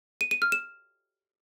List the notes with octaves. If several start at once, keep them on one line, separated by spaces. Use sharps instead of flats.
D#7
D#7
F6
E7